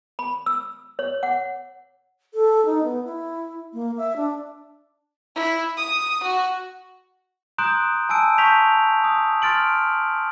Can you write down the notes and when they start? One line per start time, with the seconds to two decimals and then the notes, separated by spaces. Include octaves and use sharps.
0.19 B5
0.46 E6
0.99 C#5
1.23 F#5
2.34 A4
2.66 D#4
2.84 B3
3.04 E4
3.74 A#3
3.98 E5
4.16 D4
5.35 E4
5.77 D#6
6.23 F#4
7.58 A#5 C6 D#6 F#6 G6 D7
8.09 G#5 A5 E6 D7
8.38 A5 C#6 G6 B6 F7
9.04 D#6
9.42 C6 F6 A6 D7 F#7